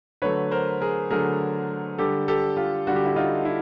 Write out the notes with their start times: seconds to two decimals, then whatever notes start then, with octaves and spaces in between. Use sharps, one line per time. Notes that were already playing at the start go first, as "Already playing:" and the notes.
0.22 D3 F#3 A3 B4 C#5
0.51 A#4 C5
0.80 G#4 A#4
1.10 D3 F#3 A3 G#4 A#4
1.98 D3 G3 G4 A4
2.28 G4 A4
2.57 F4 G4
2.87 D3 G3 F#4
2.96 G4
3.06 E4 F#4
3.16 D#4 F4
3.45 E4